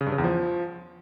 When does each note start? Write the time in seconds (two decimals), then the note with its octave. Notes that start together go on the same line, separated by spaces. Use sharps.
0.01 C#3
0.06 G2
0.12 C#3
0.18 E2
0.24 F3